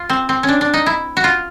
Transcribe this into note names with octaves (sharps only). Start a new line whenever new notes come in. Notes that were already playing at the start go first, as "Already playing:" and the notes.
Already playing: F4
C4
C4
C#4
D4
D4
D#4
E4
F#4
F4